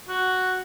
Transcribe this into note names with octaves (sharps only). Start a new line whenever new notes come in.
F#4